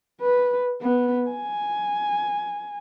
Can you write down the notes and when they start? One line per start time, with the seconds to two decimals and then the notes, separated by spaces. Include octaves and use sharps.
0.21 B4
0.81 B3
1.30 G#5